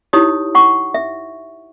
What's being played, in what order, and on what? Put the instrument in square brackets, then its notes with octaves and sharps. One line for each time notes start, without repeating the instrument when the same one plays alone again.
[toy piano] D#4 E4 G4 C#5 D#6
F#5 C#6
E5